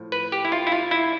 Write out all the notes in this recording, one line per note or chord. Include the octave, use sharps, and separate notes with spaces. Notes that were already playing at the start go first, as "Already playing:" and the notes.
Already playing: A2 F3
B4
G4
E4
F4
E4
F4
E4